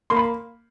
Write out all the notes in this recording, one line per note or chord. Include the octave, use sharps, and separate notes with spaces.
A#3 C6
B5